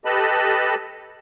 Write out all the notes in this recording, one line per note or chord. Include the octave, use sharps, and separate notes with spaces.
G4 A4 B4 D#5 A5 B5